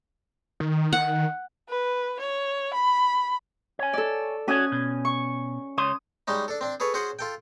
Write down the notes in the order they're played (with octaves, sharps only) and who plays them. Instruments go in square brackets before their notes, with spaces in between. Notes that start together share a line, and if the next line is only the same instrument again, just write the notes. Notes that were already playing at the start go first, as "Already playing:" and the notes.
[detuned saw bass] D#3
[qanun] F#5
[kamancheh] B4
C#5
B5
[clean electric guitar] C#5 G#5
[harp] A4 D5
[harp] C#4 G#5 D#6 [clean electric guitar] F#4 C#5
[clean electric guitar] B2
[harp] C#6
[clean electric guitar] C#2 C#5 C6 [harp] D#6
[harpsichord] G3 G#3 C#4 D#4
D4 A4
C4 D4
G#4 A4 B4 C#5
C#4 F#4 G#4 C5 F#5
F4 A4 G5